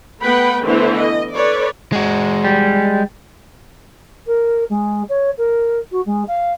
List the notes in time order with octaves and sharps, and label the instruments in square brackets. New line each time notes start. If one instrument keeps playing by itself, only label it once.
[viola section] A3 B3 B4 F#5 G5 B5
D3 E3 A3 B3 E4 C5
D#5
A4 B4 C#5 D5
[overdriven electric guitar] G#3 F#4
[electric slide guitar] G3
[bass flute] A#4
G#3
C#5
A#4
F#4
G#3
F5